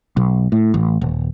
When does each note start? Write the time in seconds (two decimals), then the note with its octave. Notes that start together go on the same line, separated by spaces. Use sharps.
0.17 B1
0.52 A2
0.74 A1
1.01 D#1